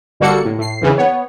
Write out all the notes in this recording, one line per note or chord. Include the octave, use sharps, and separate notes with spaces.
G1 G3 A#3 F#4 A4 C#7
A2
A2 C7
E2 C#3 E3
B3 C#5